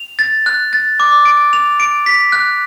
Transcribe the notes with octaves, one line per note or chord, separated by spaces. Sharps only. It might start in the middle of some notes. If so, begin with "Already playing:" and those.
Already playing: F7
A6
F#6
A6
D6
D7
F7
D7
B6
F#6